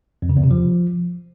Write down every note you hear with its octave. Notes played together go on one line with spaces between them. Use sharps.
F2
C#3
E2
C3
F3